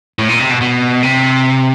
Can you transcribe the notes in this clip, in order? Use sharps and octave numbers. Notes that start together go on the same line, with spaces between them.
A2
A#2
C3
B2
B2
C3